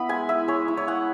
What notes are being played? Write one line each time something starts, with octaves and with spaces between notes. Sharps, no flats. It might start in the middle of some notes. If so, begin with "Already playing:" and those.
Already playing: B3 E4 B5
G#3 G#5
E4 E5
G#3 C#5
E4
C#5
G#3 F#5